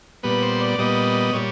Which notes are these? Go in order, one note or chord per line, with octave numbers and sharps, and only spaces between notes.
A#2 G3 B3 B4
C5
D5
A#2 G3 B3 D#5
A#2 G3 C#5